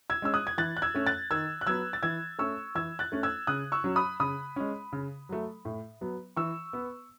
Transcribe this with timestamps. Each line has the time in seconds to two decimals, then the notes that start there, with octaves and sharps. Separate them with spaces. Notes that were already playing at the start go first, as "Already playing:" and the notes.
0.10 E6 G#6
0.22 G#3 C#4 E6
0.34 D#6 F#6
0.47 G#6
0.58 E3 F#6 A6
0.77 F#6
0.82 E6 G#6
0.95 A3 C#4
1.07 F#6 A6
1.31 D#3 E6 G#6
1.61 F#6
1.66 F#3 B3 E6 G#6
1.93 A6
2.03 E3 E6 G#6
2.39 A3 C#4 C#6 E6
2.75 E3 E6 G#6
2.99 F#6 A6
3.12 A3 C#4
3.23 E6 G#6
3.47 C#3 D#6 F#6
3.72 C#6 E6
3.84 F#3 C#4
3.96 B5 D#6
4.20 C#3 B5 D#6
4.56 G#3 C#4
4.93 C#3
5.29 F#3 A3
5.65 A2
6.01 F#3 B3
6.36 E3 C#6 E6
6.73 B3